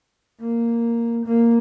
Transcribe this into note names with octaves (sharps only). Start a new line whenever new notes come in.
A#3
A#3